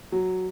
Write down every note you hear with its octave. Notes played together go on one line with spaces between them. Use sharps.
F#3